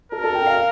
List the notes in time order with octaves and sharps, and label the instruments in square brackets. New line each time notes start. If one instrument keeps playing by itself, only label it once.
[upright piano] A4 [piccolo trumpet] A#4
[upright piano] A4
G5
F5